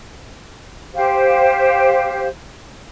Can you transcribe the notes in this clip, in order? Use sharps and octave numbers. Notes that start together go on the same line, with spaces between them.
G4 C5 F5